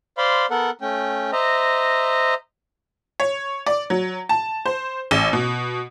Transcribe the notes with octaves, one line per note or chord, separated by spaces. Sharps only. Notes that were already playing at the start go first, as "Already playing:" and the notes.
C5 D5 F5 B5 C6
B3 A4 A#4 F#5
A3 C#4 G5
C5 D#5 E5 A#5
C#5
D5
F#3
A5
C5
A1
B2